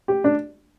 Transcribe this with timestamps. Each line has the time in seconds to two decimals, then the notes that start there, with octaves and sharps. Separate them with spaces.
0.08 G4
0.24 D4